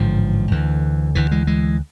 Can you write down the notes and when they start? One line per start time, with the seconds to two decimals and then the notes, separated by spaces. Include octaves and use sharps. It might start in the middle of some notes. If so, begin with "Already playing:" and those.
Already playing: A1 G#2 D3 F3
0.51 D2 D3 E3
1.15 D2 D3 E3
1.31 E3 G#3
1.47 E3 G#3